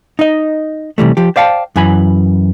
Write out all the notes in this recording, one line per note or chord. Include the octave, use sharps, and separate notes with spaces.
D#4 D#5
C3 E3 G3 A3
F3 G4
C5 D5 F5 G5 A5
F#2 E3 G#5 B5